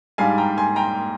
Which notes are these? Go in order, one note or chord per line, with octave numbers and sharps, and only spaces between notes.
G#2 G3 D4 F5 G#5
G5 A#5
G#5 C6
G5 A#5